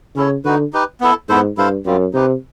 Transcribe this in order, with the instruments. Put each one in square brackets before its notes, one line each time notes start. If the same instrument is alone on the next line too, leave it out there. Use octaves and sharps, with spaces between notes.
[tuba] C#3 [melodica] C#4 E4 A4 C#5
[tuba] D3 [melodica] D#4 F#4 B4
[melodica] D#4 G4 B4
B3 E4 A4
[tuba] G#2 [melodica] B3 E4 A4 C5
[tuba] G2 [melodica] E4 A4 C5 F5
[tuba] F#2 [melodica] G3 C4 F4
[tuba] C3 [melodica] D#4 G4 B4